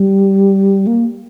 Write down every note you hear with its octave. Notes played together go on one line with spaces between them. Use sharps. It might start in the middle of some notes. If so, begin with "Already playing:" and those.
Already playing: G3
A#3